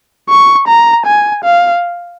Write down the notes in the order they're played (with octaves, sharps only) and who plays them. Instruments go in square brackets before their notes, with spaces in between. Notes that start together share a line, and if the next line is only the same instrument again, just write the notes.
[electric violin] C#6
A#5
G#5
F5